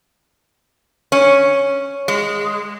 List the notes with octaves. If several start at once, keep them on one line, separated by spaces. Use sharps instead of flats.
C#4
G#3